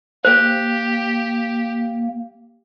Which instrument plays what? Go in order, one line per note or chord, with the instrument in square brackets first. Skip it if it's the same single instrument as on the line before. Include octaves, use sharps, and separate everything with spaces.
[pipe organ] A#3 [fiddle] G4 [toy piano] C5